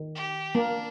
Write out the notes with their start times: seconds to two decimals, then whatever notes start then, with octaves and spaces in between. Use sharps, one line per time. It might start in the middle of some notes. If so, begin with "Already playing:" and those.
Already playing: D#3
0.15 G4
0.55 A#3 D4